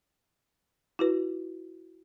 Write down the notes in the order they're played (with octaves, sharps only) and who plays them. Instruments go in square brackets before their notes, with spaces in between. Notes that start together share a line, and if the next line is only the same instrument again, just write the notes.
[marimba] E4 F#4 B4